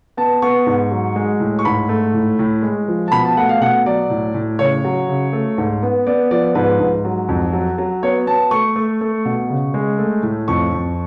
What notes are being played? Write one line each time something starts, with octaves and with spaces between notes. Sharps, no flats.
B3 A5
B3 C#6
G#2
F#3
G#3
A2
C#6
G#2 B5
A3
A2
A2
G#3
F3
A5
B2 B5
A5
A3 F#5
F5
B2 F#5
F#3 D5
A2
A2
C#3 C#5
F#3
C#3
A3
G#2
B3
B3 D5
F3 D5
G#2 B4
G#2
F#3
F2
F#3
F#3
B3 C#5
B3 A5
A3 C#6
A3
A3
B2
C#3
G#3
A3
A2
F2 C#6
F2